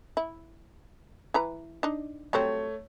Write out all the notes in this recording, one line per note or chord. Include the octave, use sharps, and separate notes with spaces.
E4
E3 B4 A#5
D4 D#4
F#3 G3 A3 C4 C#5